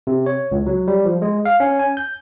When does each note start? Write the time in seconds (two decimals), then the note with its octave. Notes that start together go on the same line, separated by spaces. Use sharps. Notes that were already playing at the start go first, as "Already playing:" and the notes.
0.07 C3
0.26 C#5
0.52 C#2
0.66 F#3
0.88 G3
1.05 F3
1.22 G#3
1.45 F5
1.60 C#4
1.79 G#5
1.97 G6